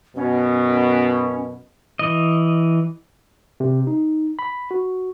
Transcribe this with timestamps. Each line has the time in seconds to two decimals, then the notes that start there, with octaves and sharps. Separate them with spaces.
0.16 F#2 B2 C#4
1.99 E3 D#5
3.60 C3
3.87 D#4
4.39 B5
4.71 F#4